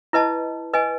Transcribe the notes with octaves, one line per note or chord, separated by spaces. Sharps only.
E4 B4 D#5 A5
B4 D#5 G#5